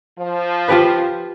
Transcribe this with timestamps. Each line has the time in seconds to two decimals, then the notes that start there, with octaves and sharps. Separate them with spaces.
0.18 F3
0.68 F4 G4 B4